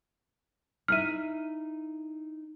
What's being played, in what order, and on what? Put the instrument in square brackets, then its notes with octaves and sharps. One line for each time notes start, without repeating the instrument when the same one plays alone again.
[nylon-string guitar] D#4 E4 E5 [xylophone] F6 D#7